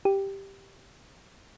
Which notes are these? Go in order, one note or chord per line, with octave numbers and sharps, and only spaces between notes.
G4